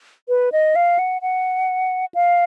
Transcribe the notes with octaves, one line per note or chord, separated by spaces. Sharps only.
B4
D#5
F5
F#5
F#5
F5